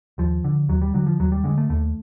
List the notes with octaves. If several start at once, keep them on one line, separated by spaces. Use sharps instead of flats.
D#2 F3
D3
D#2 F#3
G3
D3 F#3
F3
D#2 F#3
G3
D3 G#3
A3
D#2 A3